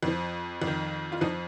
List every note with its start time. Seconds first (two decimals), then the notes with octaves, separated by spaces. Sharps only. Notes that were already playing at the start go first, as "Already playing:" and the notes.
0.03 F2 F3
0.61 F2
0.67 D#3
1.12 F4
1.21 F2 F3 D#4